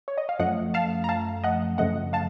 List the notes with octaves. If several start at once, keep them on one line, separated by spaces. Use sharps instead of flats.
C#5
D#5
F5
F#2 F3 A3 D#5 F#5
F5 A5
A#5
F5 A5
D#5 F#5
F#2 C#3 F3 A3 D#5 F#5
F5 A5